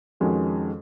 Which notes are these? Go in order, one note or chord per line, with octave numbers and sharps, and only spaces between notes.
F2 D#3 G#3 C#4 F#4